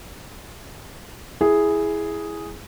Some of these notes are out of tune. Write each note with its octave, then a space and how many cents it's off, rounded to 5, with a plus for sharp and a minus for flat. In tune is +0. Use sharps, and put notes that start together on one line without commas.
E4 +0 G#4 +0